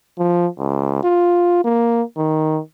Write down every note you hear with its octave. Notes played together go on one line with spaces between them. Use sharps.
F3
C#2
F4
A#3
D#3